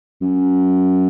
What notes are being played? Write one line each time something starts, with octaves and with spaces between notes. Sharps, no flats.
F#2